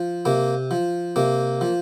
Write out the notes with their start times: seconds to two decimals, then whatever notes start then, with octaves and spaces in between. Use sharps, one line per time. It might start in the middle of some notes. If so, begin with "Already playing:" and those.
Already playing: F3
0.25 C3 A#3
0.71 F3
1.16 C3 A#3
1.61 F3